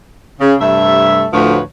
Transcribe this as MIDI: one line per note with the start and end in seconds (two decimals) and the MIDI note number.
0.40 0.54 49
0.60 1.27 43
0.60 1.27 48
0.60 1.27 57
0.60 1.27 76
1.33 1.60 38
1.33 1.60 45
1.33 1.60 53
1.33 1.60 66
1.33 1.60 71
1.33 1.60 73